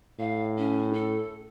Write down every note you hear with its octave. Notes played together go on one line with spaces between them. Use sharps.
A2 F5
C#4
A4